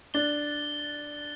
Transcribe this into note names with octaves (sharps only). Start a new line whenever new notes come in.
D4 A6 G7